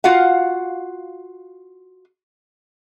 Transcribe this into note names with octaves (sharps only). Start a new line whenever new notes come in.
F4 F#4 F5 F#5